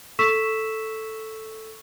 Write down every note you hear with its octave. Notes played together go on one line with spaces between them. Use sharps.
A4 C#6 E6 B6 E7